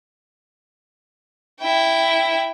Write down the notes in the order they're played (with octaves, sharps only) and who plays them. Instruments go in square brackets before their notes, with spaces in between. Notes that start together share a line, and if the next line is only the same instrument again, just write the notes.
[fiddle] E4 G5